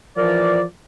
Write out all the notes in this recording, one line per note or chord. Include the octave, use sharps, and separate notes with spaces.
E3 F3 A#4 D5